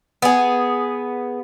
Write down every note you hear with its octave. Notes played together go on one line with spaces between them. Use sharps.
B3 G#4